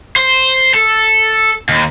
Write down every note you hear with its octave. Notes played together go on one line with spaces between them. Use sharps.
C5
A4
D#2